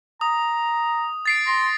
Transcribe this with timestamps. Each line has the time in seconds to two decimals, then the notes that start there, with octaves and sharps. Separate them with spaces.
0.21 A#5 D#6
1.26 A6 C7 D7
1.47 C6 A#6